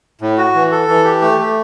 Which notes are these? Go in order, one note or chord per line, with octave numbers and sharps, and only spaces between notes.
A2
F#4
E3
A4
E3
G4
A3
A3